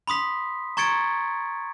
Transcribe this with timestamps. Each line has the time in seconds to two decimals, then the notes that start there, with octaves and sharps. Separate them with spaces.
0.08 B5 C6 D#6 B6
0.77 A#5 C#6 G#6 A6 C#7 D7